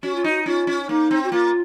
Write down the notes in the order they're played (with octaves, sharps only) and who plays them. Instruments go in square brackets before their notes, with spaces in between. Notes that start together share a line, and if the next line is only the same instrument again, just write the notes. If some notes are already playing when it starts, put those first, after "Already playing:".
[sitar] C#4 [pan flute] F#4
[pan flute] F4
[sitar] D#4 [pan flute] F#4
[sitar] C#4 [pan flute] F4
[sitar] C#4
[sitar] A#3 [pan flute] D#4
[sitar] C4
[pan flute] F#4
[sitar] A#3 [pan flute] F4